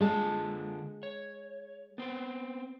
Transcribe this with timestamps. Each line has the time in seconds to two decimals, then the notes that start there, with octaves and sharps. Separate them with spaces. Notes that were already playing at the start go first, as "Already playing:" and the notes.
0.01 D3 G#3 F4 A5
1.03 C#5
1.98 B3 C4